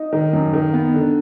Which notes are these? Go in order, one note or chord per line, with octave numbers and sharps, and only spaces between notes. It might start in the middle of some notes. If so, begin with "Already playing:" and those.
Already playing: D#4
D#3
F#2
D#3
B3
D3